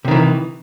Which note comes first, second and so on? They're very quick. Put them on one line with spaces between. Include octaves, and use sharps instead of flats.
C3 D#3 E3